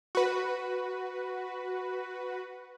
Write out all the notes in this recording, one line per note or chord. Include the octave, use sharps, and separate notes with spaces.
F#4 B4